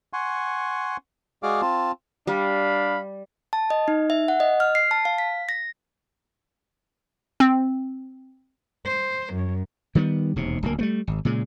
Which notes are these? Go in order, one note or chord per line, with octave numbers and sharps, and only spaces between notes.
F#5 G#5 C6 C#6
G#3 F#4 G#4 D5 F5 D6
C4 F4 A5
G3 D4 F5 B5
A5
D#5
D#4
E5
F#5
D#5
F6
C7
A5
F5
B6
A#6
C4
C5
F#2
D#3 G3 A#3 B3
E1 D#2 C3
D1 D2 A#3
G3 A3 B3
G#1
A#2 C#3 G#3